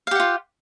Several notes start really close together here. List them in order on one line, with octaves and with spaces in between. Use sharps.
F5 G4 F#5 F4